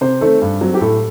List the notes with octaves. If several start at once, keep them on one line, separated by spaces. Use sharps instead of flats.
C3 C5
D#3 A3 C4 A4
G2
F#3 C4
G4
A2 A4